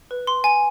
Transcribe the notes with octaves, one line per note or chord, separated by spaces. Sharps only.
B4
C6
G#5